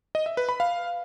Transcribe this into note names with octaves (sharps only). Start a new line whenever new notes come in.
D#5
E5
B4
B5
F5